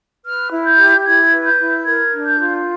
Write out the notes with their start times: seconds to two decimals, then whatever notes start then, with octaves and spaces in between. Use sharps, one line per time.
0.24 B4 F6
0.50 E4
0.65 G6
0.78 G4
1.05 E4 G#6
1.31 B4
1.46 G6
1.58 E4
1.85 A#4 G#6
2.13 D4
2.26 G6
2.39 F4